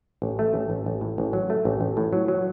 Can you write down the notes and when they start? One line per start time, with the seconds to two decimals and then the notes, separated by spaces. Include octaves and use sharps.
0.22 A1
0.39 A3
0.54 A1
0.70 A1
0.86 A1
1.01 A2
1.18 A1
1.33 F#3
1.50 A3
1.65 A1
1.81 A1
1.97 A2
2.13 F#3
2.28 F#3